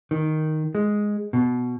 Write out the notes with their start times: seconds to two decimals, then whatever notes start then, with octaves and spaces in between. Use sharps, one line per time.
0.11 D#3
0.75 G#3
1.33 B2